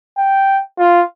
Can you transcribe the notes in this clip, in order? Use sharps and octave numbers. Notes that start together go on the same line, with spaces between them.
G5
F4